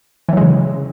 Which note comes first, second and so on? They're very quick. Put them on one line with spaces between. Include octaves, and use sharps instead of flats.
E3 F#3 G#3 C#3